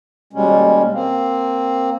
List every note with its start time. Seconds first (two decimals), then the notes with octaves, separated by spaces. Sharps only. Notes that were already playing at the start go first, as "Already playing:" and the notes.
0.33 D#2 B2 G3 G#3 C#4
0.92 A#3 C4